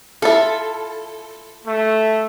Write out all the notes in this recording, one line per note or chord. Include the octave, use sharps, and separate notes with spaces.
E4 F4 A4
A3